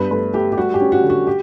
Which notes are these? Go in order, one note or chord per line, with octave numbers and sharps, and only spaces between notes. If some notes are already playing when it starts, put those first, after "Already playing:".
Already playing: G2 B3 B4
A3 B4
A3 G4
G4
G3 F#4
G4
C#4
F#4
D3
F#4
G4